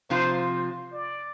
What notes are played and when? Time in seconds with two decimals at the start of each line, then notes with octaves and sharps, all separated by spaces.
0.10 C3 F3 C4 F4 C5
0.93 D5